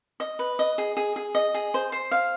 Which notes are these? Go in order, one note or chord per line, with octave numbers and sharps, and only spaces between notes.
D#5
B4
D#5
G#4
G#4
G#4
D#5
G#4
C5
C5
F5